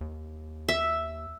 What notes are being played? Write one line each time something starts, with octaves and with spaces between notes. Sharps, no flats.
D#2
E5